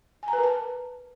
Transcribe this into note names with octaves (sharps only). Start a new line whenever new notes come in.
G#5
A#5
B4
A#4
A5